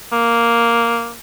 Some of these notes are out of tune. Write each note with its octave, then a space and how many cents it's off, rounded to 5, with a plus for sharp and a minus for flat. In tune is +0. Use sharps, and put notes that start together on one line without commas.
A#3 +0